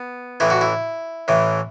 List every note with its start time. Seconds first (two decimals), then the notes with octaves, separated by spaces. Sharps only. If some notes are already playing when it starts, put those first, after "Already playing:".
Already playing: B3
0.40 A1 A2 E3 E4
0.50 F#4
0.61 E4
1.28 A1 A2 E3